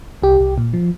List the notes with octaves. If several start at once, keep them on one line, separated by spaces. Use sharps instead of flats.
C2 G4
C2
A#2
F3